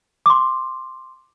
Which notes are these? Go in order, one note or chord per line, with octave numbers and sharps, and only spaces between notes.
C6 D6